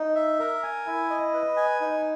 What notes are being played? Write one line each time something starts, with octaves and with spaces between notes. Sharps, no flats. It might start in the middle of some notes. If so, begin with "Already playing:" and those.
Already playing: D#4
E5
A#4
G#5
E4
D#5
B4
G#5
D#4